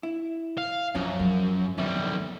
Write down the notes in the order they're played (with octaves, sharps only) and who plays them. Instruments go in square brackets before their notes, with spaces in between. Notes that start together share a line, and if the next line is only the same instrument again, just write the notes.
[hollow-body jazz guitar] E4
[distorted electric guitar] F5
[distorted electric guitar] F#2 [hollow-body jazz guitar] F3 C#4 [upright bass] D4
[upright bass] F#3 G#3
[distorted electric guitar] B1 G3 [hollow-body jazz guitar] F2 E5 [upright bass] D#3